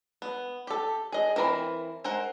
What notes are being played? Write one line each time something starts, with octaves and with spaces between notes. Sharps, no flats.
B3
G4 A4
G#4 D#5
E3 C4 A#4 A#5 B5
G#3 A#4 C5 F#5